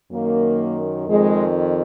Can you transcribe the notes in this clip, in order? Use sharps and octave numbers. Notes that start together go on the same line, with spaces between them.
F#2 D#3 A#3
F2 D#3 G#3